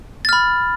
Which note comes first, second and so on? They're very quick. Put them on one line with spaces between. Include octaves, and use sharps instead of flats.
A6 F6 B5